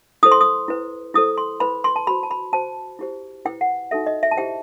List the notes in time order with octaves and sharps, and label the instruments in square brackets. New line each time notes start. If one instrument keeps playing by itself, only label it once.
[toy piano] E4 A4 C5 D#6
C6
D#6
E4 B4
E4 A4 C5 D#6
C6
E4 B4 B5
C6
A5
F#4 C5 B5
A5
B5
F#4 C5 A5
E4 G4 C5
E4 B4 G5
F#5
D#4 F#4 A4 E5
D#5
E5
A5
E4 G4 C5 G5